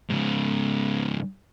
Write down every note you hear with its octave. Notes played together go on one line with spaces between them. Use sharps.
G#2 C#3